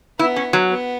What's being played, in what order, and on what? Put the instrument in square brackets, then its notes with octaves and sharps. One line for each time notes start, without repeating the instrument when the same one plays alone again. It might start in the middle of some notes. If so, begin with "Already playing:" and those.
[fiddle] B3 [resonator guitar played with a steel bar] E4
[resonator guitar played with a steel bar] C#4
F#3
[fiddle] B3